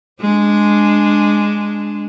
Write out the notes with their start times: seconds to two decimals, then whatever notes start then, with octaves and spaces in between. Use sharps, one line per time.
0.21 G#3 D4